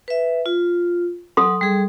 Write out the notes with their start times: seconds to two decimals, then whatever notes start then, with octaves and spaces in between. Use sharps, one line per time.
0.08 B4 E5
0.46 F4
1.37 F#3 A4 C6
1.61 G3 G#4